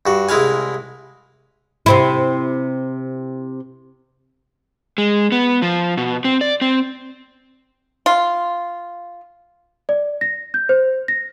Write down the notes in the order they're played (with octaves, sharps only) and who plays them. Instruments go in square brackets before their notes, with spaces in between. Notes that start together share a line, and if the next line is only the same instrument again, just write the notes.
[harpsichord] G2 F#4
C2 G#3 E4 F5 G#5
[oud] C3 C4 E4
[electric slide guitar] G#3
B3
F3
B2
C4
D5
C4
[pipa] F4
[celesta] D5
A#6
G6
C5
A#6